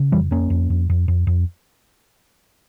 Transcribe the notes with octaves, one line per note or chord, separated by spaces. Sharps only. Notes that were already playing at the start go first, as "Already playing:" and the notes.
Already playing: C#3
F2 E3 G3
F2 A#3 C#4
F2
F2
F2
F2
F2